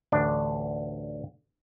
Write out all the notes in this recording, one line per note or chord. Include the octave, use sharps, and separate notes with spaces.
A1 D2 D4